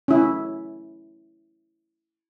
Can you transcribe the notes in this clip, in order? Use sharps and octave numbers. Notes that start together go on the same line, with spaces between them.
C#4 E4